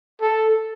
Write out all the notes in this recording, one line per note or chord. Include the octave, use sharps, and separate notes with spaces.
A4